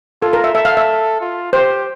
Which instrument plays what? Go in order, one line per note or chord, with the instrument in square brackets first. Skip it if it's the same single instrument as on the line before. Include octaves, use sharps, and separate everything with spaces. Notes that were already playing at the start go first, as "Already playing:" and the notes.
[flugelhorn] F4 [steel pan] A4
[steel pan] A#4
E5
[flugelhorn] A4 [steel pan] E5
[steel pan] F5
E5
[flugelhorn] F4
[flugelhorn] G4 [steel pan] C5